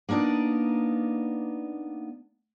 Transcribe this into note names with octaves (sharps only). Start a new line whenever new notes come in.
A#3 B3 D4 D#4 D5